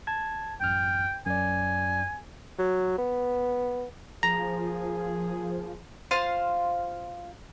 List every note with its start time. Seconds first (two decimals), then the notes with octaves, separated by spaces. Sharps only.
0.07 A5 G#6
0.61 A1 F#2 G5 F6
1.26 F#2 D5 G#5
2.58 F#3
2.98 B3
4.23 F3 A#3 G#4 A#5
6.11 F4 C5 F5 C6